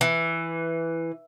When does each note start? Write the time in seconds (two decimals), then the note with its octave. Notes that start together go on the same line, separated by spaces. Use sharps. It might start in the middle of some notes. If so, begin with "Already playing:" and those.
0.01 E3